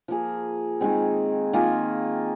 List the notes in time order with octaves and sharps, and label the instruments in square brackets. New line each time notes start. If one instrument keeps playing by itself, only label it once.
[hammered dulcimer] F3 A#3 G#4
D#3 G#3 C4
D#3 A#3 F4 G#4